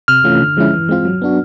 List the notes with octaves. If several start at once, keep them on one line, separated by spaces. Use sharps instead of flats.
C3 F6
E3 A3 C#4 F4
D3
F3 G#3 C#4 E4
E3
G#3 C4 F4
F#3
B3 D4 F#4